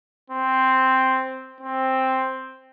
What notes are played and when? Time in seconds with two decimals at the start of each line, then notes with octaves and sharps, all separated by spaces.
0.30 C4
1.61 C4